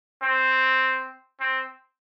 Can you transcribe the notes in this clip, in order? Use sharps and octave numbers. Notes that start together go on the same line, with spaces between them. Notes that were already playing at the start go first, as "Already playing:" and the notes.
C4
C4